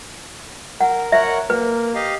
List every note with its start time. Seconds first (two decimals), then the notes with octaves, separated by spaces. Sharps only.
0.81 A#4 F#5
1.12 A#4 C#5 E5 F#5
1.50 A#3 B4
1.95 G4 D#5 F5